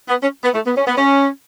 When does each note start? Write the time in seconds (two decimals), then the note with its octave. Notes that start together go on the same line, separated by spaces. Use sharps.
0.09 B3
0.22 C#4
0.44 B3
0.54 A3
0.66 B3
0.76 C#4
0.87 B3
0.97 C#4